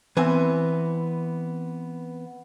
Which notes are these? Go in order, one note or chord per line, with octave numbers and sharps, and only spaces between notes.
E3 B3 C4 G#5